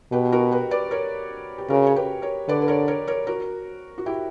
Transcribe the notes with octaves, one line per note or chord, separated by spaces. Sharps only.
B2 G4 B4
F#4 A#4
G4 B4
B4 D5
A#4 C#5
G4
C#3 F#4 A#4
C#5
G4 B4
A#4 C#5
D3 B4 D5
B4
A#4 C#5
A#4 C#5
A#4 C#5
F#4 A#4
F#4
E4 G4